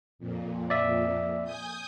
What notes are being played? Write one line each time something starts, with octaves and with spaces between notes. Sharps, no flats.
F2 A#2
D5 E5
G#5 D#6 G6